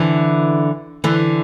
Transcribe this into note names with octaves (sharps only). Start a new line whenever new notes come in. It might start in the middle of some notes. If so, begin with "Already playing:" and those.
Already playing: D3 E3
D3 E3